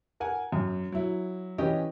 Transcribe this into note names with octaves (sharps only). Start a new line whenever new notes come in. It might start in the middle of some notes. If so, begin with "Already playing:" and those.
A#4 F#5 G#5
F#2
F#3 E4
E3 C#4 G4 B4 D#5